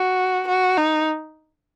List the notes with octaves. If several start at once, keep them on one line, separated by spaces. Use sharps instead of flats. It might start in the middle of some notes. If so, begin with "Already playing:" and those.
Already playing: F#4
F#4
D#4